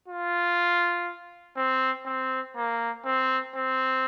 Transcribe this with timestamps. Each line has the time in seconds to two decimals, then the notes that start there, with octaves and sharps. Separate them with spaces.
0.08 F4
1.57 C4
2.06 C4
2.56 A#3
3.05 C4
3.55 C4